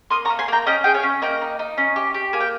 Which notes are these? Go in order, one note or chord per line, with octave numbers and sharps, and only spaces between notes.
A#3 C6 D#6
A#5 C#6
A#3
G#5 C6
A#3 G5 A#5
C#4 D#5 G5
G#4 G5
C#5 F5
C#4
A#3 D#5 G5
D#4
D#4
C#4
G4
G4
A#3 G#5
G5